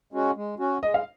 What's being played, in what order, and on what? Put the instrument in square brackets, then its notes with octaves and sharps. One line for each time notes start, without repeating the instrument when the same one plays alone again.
[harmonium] G#3 C#4 F#4
G#3
C#4 F#4
[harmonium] G#3 [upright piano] D#5
[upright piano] F5